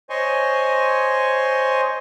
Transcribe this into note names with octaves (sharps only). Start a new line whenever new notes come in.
C5 C#5 D#5 G#5 C6 C#6